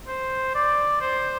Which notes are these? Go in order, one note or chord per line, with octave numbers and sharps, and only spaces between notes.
C5
D5
C5